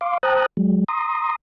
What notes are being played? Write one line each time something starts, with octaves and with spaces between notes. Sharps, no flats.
F5 C6 D6
C5 G5 A5 A#5 D#6 F#6
F#3 G#3
A#5 C6 D#6